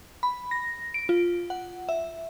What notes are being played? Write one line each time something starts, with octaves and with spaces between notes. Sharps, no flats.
B5
A#6
D7
F4
F#5
E5